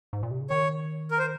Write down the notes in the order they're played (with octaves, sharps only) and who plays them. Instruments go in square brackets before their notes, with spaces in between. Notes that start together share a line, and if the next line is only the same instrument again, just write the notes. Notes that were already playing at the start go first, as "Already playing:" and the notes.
[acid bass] G#2
A#2
C3
C#3
[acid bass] D#3 [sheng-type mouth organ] C#5
[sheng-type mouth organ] A#4
C5